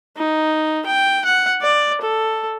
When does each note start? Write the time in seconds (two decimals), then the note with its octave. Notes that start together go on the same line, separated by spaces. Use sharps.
0.17 D#4
0.86 G5
1.25 F#5
1.61 D5
2.01 A4